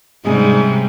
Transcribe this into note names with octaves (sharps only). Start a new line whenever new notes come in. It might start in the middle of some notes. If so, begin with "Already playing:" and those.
G#2 C3 G3 G#3 C#4 G#4